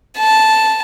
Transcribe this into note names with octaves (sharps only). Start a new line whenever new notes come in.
A5